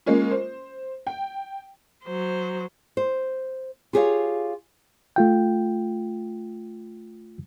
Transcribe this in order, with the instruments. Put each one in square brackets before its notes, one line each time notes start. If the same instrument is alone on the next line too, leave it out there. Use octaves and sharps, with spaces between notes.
[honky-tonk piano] G#3 A#3 C#4 F4
C5
G5
[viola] F#3 C5
[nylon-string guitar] C5
F4 G4 G#4 C5 C#5 F5
[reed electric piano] A3 F4 G5